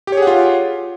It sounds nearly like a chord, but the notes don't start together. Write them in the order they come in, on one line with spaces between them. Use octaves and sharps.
G4 C#5 G#4 F#5 F4